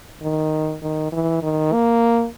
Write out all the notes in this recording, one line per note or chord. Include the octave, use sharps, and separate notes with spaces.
D#3
D#3
E3
D#3
A#3